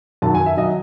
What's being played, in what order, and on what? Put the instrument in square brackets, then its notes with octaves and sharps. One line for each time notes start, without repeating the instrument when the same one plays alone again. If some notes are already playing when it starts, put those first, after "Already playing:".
[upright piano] F#2 D#3 F#3 A5
G#5
E5
D#3 F#3 D#5